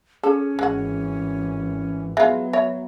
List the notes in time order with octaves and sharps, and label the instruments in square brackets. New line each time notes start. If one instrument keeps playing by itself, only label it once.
[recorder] C#4 [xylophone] G#4 [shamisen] A4
[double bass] G#1 E3 [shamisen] G#3 F#4
[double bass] F#3 B3 [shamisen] G#3 F4 [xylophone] E5
[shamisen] C#5 [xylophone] E5